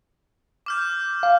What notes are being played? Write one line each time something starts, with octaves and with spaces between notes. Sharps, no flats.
D6 F6 G6
F5